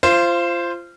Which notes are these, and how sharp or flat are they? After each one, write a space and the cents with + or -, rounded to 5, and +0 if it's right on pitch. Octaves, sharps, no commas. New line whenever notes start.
F4 -25 C5 +0